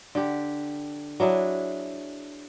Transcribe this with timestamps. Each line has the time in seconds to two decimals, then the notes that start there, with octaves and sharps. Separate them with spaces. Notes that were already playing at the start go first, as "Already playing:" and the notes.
0.15 D3 G4
1.20 F#3 D4 E4 G#4